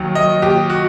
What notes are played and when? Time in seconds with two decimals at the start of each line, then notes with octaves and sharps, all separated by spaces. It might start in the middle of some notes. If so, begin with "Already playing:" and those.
Already playing: D#2 D#3 F#3
0.15 F#3 D#5
0.42 D#2 G4
0.70 F#4